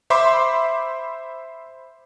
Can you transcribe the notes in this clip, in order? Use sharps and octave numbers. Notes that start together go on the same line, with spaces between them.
C5 E5 B5 C6 D6